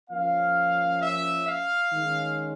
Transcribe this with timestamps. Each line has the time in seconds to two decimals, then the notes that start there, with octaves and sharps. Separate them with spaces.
0.10 F3 A#3 C#4 F5
1.01 E5
1.46 F5
1.91 D#3 G#3 C#4